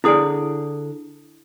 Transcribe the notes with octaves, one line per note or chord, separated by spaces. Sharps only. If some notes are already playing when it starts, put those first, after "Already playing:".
D3 E4 G#4 D5 D#6